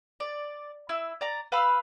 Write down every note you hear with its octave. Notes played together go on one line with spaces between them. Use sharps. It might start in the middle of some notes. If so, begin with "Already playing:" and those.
D5
E4 E6
D5 A#5
B4 F5 B5 E6